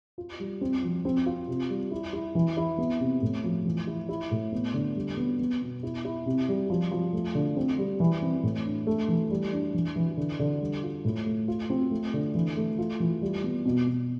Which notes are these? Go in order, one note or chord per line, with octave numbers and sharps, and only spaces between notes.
F4
G3
C4
F3
C4
F4
C3
G3
E4
E4
E3
E4
B3
C3
A2
F3
E3
E4
E4
A2
B3
D3
G3
B3
B3
B2
E4
E4
C3
G3
F3
F3
A3
D3
C4
G3
E3
C4
A2
D4
A3
E3
G3
D4
E3
E3
D3
D3
G3
F4
A2
A3
F4
C4
A3
D3
E3
A3
F4
E3
G3
B3
B2
B2